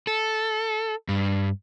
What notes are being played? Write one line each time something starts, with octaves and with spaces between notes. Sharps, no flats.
A4
G2